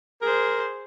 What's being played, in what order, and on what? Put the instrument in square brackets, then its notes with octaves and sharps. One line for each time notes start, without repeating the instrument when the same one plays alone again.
[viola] G#4 C5 [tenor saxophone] A#4